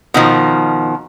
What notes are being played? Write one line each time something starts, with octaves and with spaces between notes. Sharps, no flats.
B2 D#3 F3